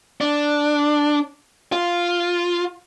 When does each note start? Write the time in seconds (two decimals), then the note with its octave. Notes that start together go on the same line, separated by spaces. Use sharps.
0.21 D4
1.72 F4